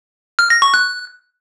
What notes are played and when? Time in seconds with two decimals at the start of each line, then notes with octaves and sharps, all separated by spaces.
0.39 F6
0.50 A#6
0.62 C#6
0.74 F#6